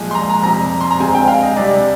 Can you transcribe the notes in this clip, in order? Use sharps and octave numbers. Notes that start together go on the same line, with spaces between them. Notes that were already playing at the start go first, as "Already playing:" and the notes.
Already playing: C2 A#2 F3 G#3 G#5
C6
A#5
A#5
F2 C3 G3 A#5
C6
A#5
D2 D3 G#3 C4 G#5
G5
F5
D#5
C2 C3 G3 D5